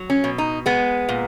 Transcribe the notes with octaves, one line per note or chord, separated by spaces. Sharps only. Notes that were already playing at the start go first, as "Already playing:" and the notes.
Already playing: F#3
C#4
B2
D#4
G#3 B3
A#2